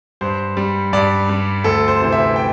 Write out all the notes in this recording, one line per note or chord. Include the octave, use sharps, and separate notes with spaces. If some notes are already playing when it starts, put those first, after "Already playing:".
G2 C5
G3
G2 D5
G3
D2 A4
C5
C3 E3
E5
G5